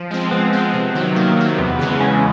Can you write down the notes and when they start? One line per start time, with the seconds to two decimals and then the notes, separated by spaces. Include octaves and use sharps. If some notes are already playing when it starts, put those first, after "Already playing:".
Already playing: F3
0.11 G#3 C4
0.31 F3 B3
0.53 G#3 C4
0.74 C3
0.95 D#3 F#3
1.16 C3 A#3
1.37 D#3 F#3
1.58 E2 B3
1.79 C#3 E3 G#3
2.01 E2 C#4